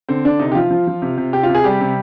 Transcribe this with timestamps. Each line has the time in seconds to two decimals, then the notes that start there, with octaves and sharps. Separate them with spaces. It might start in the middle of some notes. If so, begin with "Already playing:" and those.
0.09 D3 C4
0.25 D3 D4
0.39 C3 D#4
0.52 G4
0.55 F3 F4
0.71 F3
0.87 F3
1.02 C3
1.18 C3
1.33 C3 G4
1.43 F4
1.49 C3
1.55 G#4
1.64 G3 G4
1.81 C3